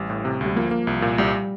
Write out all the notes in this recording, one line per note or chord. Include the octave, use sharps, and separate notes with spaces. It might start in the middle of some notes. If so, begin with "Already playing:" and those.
Already playing: A1 G3
A2
C3
D2 G3
F3 A#3
A#3
C2
A#2
C2 G3